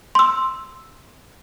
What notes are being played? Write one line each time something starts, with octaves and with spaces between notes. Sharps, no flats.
C6 E6